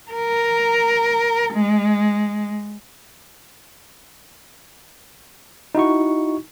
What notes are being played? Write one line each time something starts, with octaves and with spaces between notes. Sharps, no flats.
A#4
G#3
D#4 E4 F#4 C#6